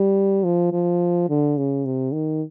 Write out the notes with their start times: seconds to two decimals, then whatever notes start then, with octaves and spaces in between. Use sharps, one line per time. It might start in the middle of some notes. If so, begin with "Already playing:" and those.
Already playing: G3
0.44 F3
0.72 F3
1.29 D3
1.57 C#3
1.85 C3
2.13 D#3